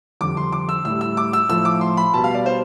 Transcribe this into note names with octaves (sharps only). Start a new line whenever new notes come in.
F2 D3 G3 D6
C6
D6
E6
A2 G3 E6
E6
D6
E6
A2 F3 E6
D6
C6
B5
B2 G3 A5
F5
D5
C5